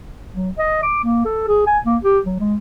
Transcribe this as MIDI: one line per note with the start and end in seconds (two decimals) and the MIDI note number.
0.35 0.50 54
0.59 0.80 75
0.83 1.02 86
1.04 1.22 58
1.25 1.47 69
1.48 1.63 68
1.67 1.78 80
1.85 1.97 58
2.03 2.19 67
2.26 2.37 54
2.40 2.56 56